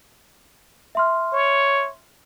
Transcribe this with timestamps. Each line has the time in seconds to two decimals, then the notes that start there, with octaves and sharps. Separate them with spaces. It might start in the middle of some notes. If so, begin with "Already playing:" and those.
0.95 E5 C6 F6
1.32 C#5